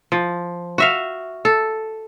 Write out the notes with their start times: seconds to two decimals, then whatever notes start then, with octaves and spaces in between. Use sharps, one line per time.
0.12 F3
0.78 F#4 E5 F5
1.45 A4